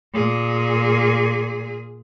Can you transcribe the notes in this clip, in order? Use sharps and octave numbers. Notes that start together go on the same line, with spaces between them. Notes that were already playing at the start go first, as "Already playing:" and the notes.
A#2 G#4